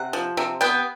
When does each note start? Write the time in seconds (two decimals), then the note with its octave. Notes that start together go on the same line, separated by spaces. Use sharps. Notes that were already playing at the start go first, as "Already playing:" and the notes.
Already playing: C3 F#5
0.13 F3
0.37 C3
0.61 B3 G5